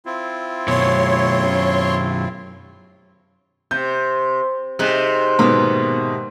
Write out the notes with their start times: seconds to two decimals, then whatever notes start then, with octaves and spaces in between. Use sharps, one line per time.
0.06 C4 E4 F4
0.68 F#2 B2 C#5 C6
3.71 C3 G6
4.79 C3 D#4 G#4 F#6
5.39 G#2 B2 D#3 A#3 B3